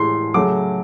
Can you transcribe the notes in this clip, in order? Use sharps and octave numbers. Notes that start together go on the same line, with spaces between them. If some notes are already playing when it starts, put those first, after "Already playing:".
Already playing: A2 E3 G#3 C6
C#3 F#3 A3 C#4 D6